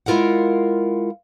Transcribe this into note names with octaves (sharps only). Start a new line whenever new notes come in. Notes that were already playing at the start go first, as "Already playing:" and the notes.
G#3 E4 F4 A#4 F5 F#5